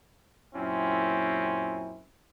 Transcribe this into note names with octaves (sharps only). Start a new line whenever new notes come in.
F#2 A#2 C4 C#4 E4